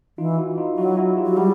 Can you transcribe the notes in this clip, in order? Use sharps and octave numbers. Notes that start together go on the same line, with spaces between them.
E3 D#4 F4
E4 F#4
D#4 F4
F#3 E4 F#4
E4 F#4
F4 G4
F#3
G3 F#4 G#4